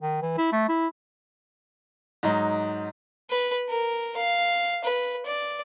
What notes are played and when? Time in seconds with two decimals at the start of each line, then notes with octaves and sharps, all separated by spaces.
0.02 D#3
0.22 E3
0.38 E4
0.53 A3
0.69 E4
2.23 G#2 F#3 D#4
3.30 B4
3.69 A#4
4.17 F5
4.84 B4
5.26 D5